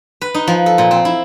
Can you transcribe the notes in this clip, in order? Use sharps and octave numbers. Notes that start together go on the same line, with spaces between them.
B4
D#4
F3
A4
A#2
C4
E4